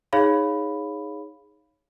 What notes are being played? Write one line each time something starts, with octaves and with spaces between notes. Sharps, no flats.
D#4 G#4 C#5 F5 B5